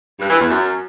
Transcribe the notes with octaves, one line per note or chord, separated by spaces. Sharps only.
G2
E3
E2
F#2